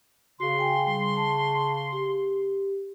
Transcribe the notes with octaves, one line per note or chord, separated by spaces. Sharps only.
C#3 F#4 C6
G5 G#5
G3
A5
G4